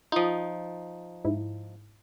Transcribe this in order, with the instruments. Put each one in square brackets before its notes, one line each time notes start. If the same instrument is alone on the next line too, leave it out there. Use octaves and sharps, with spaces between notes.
[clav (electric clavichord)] F3 D#4 [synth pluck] F4 D#6
[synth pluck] G#2 E4